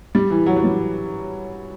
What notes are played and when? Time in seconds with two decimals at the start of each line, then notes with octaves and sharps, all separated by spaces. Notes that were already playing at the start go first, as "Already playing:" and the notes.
0.15 G3
0.30 E3
0.46 F#3
0.56 F#3
0.64 G3